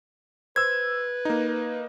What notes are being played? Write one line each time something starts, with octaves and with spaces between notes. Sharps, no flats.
B4 C5 E6 G#6
A#3 D#4